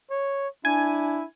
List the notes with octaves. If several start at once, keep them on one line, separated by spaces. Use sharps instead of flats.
C#5
D4 E4 G#5